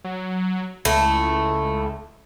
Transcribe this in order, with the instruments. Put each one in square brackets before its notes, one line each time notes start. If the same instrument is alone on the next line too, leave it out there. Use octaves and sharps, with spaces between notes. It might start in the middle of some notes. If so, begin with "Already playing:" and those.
[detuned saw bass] F#3
[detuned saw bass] C#2 [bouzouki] A3 E4